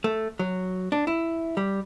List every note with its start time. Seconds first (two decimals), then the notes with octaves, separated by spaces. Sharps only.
0.04 A3
0.39 F#3
0.92 D4
1.07 E4
1.57 G3